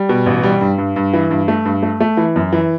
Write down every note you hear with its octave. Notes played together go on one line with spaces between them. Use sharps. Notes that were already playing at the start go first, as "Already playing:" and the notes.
Already playing: G3
B2
A1
G3
G2
G2
G2
E3
G2
A3
G2
A3
A3
E3
F#2
E3